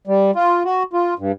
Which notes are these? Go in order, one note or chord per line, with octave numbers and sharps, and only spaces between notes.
G3
F4
F#4
F4
G2